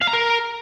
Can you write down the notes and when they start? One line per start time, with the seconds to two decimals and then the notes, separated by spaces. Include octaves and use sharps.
0.01 F5
0.07 A#5
0.13 A#4